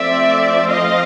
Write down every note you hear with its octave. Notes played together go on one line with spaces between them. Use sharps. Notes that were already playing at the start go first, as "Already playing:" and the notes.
Already playing: F3 A3 C4 D5 E5
D#5 F5